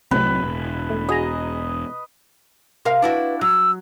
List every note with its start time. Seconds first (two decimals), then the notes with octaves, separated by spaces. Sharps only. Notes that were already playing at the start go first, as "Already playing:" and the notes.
0.11 C2 F#2 A2 C3 F#3 C4 B4
0.42 E1
0.90 A3
1.09 F#4 G#4 D#5 A#5
2.85 C3 A#4 F5
3.02 D4 E4 F#4 B4
3.41 F#3 E6